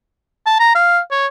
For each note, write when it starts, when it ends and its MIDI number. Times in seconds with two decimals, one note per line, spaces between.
0.46 0.57 81
0.60 0.71 82
0.75 0.99 77
1.11 1.27 73